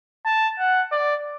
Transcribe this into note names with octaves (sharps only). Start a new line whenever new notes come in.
A5
F#5
D5